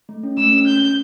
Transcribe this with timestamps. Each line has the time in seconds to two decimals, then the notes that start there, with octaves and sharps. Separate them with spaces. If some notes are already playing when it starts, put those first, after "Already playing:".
0.09 A3
0.23 C#4
0.38 A3 E6
0.53 C#4
0.67 A3 G6
0.81 A3